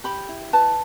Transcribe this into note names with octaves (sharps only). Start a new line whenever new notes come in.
G4 B5
E4
B4 A5